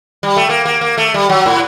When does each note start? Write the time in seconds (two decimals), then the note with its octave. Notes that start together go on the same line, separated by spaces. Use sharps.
0.23 G3
0.36 A3
0.49 A#3
0.65 A#3
0.81 A#3
0.98 A3
1.14 G3
1.29 F#3
1.46 A2